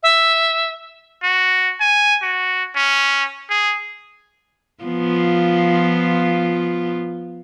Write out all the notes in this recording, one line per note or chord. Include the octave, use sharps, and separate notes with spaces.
E5
F#4
G#5
F#4
C#4
G#4
F3 B3 F4